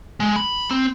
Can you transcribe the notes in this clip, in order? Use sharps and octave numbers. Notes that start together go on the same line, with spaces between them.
G#3
B5
C4